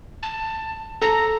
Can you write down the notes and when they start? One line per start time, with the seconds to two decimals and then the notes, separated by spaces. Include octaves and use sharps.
0.23 A5
1.02 A4 A#5